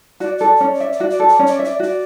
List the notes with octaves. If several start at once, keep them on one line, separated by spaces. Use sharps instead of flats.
F#4 D5
A4 D5
C#4 D5
D5
E5
D5
F#4
D5
A4
D5
C#4
D5
E5
D5
F#4 D5